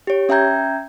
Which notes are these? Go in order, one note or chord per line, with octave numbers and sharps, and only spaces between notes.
G4 C#5
C#4 E5 G5 A#5 G6 G#6